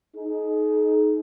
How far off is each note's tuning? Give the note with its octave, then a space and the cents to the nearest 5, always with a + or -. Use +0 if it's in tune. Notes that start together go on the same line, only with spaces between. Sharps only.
D#4 +0 G#4 +45